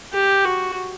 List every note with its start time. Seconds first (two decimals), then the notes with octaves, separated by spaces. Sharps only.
0.13 G4
0.44 F#4